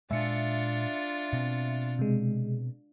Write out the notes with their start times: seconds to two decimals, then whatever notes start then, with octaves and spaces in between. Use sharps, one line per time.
0.11 A#2 G#3 D4 F4 E5 C#7
1.33 B2 C4
1.99 C3 G#3